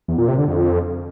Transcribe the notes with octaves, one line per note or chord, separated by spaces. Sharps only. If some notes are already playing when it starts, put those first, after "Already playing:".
E2
A#2
C3
D3
F2